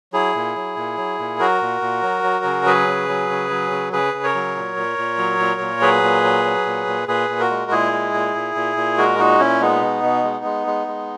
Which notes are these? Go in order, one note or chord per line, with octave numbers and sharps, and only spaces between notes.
F#3 E4 G#4
A#2
F#3
A#2
F#3
A#2
F#3 F#4 A#4
A#2
A#2
F#3
F#3
C#3
F#3 G#4 B4
C#3
F#3
C#3
F#3
C#3
C#3 G#4 B4
C#3
A#4 C#5
F#3
A#2
A#2
A#2
F#3
A#2
A#2
F#3 G#4 B4
A#2
F#3
F#3
A#2
A#2
A#2 G#4 B4
A#2
F#4 A#4
G#3
A#2 E4 G#4
G#3
A#2
A#2
A#2
A#2
G#3 F#4 A#4
A#2 D#4 F#4
A#2 C#4 E4
G#3 B3 D#4
B2
B2
G#3
G#3
G#3
G#3